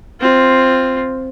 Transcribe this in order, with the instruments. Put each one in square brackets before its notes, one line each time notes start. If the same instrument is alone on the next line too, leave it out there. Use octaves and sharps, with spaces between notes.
[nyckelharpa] C4 F4